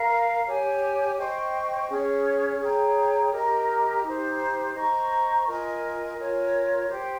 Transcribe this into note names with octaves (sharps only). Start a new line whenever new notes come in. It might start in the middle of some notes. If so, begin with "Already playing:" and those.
Already playing: A#4 F5 A#5
G4 C#5 G#5
C5 D#5 G5 C#6
C#4 G#4 C#5
G#4 C#5 G5 A#5
G4 A#4 D#5 A#5
D#4 G4 C5
C5 D#5 A#5 C#6
F4 A#4 D#5 G#5
F4 A#4 C#5 G#5
G4 C5 G5